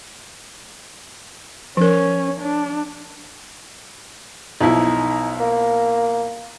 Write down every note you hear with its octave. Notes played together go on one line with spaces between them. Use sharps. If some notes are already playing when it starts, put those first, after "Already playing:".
F3 C#4 A#4
D4
B1 F3 D#4 E4
A#3